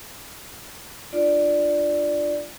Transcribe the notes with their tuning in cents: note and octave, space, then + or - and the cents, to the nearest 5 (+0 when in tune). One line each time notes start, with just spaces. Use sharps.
D4 +30 F4 +0 D5 +0